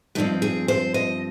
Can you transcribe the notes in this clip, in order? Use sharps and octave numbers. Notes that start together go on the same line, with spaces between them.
G2 F3 C4 D#4
G#4
C5
D#5